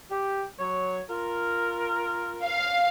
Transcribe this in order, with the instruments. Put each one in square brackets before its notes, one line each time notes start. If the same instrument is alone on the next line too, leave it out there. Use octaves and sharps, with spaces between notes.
[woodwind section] G4
F#3 C#5
F4 A#4
[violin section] F5